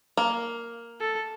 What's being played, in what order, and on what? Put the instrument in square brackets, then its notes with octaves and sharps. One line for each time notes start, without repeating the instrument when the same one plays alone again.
[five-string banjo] A#3
[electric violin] A4